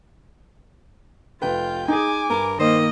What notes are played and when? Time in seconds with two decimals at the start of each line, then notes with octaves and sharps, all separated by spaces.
1.42 F1 F4 B4 G5
1.88 D#4 G#4 G#5 D6
2.30 G2 A#4
2.59 D#3 A#3 C5 D#5